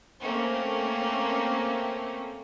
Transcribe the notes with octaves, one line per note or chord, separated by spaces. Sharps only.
A3 A#3 C4 C#4